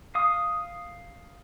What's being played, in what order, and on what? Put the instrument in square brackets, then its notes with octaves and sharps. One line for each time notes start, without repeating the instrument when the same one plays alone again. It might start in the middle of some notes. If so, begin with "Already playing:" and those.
[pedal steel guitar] F5 D#6